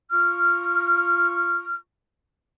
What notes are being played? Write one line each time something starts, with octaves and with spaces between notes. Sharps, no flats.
F4 C#6 F6